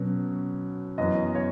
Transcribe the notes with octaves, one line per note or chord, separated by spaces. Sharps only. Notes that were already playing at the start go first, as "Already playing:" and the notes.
Already playing: B2 F#3 C#4
F#2 E3 B3 D#5
C#5